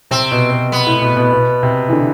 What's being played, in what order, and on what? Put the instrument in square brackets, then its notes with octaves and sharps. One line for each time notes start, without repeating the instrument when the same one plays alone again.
[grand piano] C3 [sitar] C4
[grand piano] B2
B2
[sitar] B3
[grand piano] A2
B2
B2
B2
C3
E3
D3